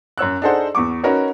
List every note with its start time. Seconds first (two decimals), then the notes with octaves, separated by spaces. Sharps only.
0.18 F#2 C#5 E6 F#6
0.42 D4 D#4 G#4 A4 C5 F#5
0.75 E2 B3 C#6 D6
1.04 C#4 D#4 F#4 A#4 B4 C#5